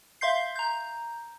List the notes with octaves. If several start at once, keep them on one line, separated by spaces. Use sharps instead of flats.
E5 F5 C6 G6 C7
A#5 G6